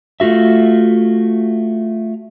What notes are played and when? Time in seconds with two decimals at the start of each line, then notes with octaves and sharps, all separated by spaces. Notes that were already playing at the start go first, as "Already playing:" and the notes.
0.20 A3 F4 F#4 E5